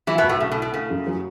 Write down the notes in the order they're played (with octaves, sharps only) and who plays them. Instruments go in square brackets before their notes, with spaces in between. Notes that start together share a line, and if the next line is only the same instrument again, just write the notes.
[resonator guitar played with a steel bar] E3 E4 [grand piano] F#3
[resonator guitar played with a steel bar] B2 B3
[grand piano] B1
[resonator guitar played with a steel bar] A2 A3
[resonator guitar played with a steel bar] C#3 [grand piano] A3
[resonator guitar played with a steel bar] B2
[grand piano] E4
[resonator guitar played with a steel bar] B2
[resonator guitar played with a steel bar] C#3 [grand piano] A3
[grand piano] F#2
F#3